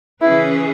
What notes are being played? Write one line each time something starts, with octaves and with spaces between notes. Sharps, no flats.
C#3 E3 C#4 E4 G#4 B4